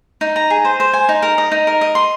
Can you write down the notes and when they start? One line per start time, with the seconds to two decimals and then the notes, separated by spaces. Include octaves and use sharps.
0.21 D#4
0.36 A#5
0.50 G#4
0.65 C5
0.80 C5
0.93 G#5
1.09 D#4
1.22 A#4
1.38 D#5
1.52 D#4
1.67 A#4
1.81 D#5
1.95 C6